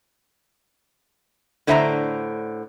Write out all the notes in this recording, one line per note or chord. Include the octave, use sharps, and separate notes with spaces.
A2 D3 C5 E5 A5 A#5